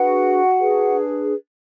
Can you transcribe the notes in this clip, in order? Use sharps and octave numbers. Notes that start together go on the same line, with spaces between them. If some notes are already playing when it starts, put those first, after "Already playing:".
Already playing: D4 F#4 G#4 B4 F#5
D4 G#4 B4